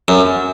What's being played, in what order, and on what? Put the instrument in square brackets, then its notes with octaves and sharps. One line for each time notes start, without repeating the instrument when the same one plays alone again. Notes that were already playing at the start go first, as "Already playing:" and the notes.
[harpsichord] F#2